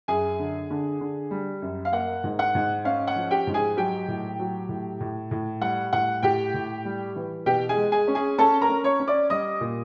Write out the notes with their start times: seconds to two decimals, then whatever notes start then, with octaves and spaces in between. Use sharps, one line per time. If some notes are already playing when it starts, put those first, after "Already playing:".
0.08 F#2 G#4 G#5
0.39 D3
0.70 D3
1.01 D3
1.31 G3
1.62 F#2
1.85 F5
1.92 A#3 F#5
2.24 G#2
2.39 F#5
2.55 G#2
2.85 C#4 F5
3.07 F#5
3.16 F3
3.31 G4 G5
3.47 G#2
3.54 G#4 G#5
3.77 F#3 G4 G5
4.08 A2
4.39 F#3
4.69 A2
5.00 A2
5.31 A2
5.61 G3 F#5
5.93 A2 F#5
6.23 A2 G4 G5
6.54 A2
6.85 G3
7.16 E3
7.46 B2 G4 G5
7.69 G#4 G#5
7.77 G#3
7.92 G#4 G#5
8.08 C#4
8.15 G#4 G#5
8.38 C#4 A4 A5
8.62 A#4 A#5
8.69 C#4
8.84 C#5 C#6
9.00 C#4
9.08 D5 D6
9.30 G3 D#5 D#6
9.61 A#2